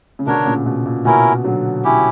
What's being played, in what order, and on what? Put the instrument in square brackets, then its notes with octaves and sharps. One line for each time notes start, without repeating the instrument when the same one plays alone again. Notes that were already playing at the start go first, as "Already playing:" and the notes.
[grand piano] C#3
[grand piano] B2 D3 [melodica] D4 A#4 C#5
[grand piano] A#2 C#3
B2
A#2
[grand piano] B2 [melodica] C#4 E4 A#4
[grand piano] D3 F#3
[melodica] C#4 E4 G4